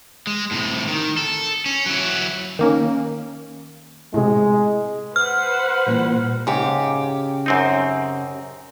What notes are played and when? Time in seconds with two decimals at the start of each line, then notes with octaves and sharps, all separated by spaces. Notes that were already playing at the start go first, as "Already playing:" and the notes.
0.27 G#3
0.51 A2 C3
0.88 D#3
1.17 A4
1.66 C#4
1.86 F#3 E4
2.59 D#3 A#3 C#4
4.14 A2 C3 G#3
5.16 B4 C5 F#5 F6
5.86 A#2 E3 G3
6.47 G#2 C#3 G4
7.46 F#2 C4 D#4